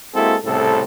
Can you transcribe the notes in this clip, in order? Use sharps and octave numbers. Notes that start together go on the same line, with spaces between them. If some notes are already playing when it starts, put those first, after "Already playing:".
G#3 A#3 C4 E4 F#4 A4
C2 A2 C#3 C4 A4